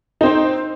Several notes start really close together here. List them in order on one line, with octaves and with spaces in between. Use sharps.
D#4 C4 C5